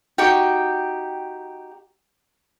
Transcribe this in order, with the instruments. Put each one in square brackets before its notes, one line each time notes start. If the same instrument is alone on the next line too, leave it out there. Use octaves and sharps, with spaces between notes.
[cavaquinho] D#4 F#4 G4 G5